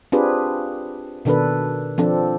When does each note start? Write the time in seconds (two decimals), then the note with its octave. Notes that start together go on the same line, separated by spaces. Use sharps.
0.12 C4 D4 F4 G4 G#4 B4
1.25 B2 D#3 D4 A4 B4
1.98 F3 C4 D4 A4